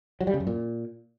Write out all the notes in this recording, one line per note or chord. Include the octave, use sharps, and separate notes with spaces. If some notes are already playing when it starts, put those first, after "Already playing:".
F#3
G3
C#3
F#2
A#2